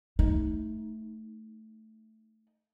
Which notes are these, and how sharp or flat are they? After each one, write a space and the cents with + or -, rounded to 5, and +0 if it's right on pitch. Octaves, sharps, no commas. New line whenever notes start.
A3 +0 D#4 +15